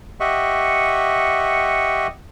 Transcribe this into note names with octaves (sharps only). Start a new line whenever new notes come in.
G4 D#5 E5 F#5 C#6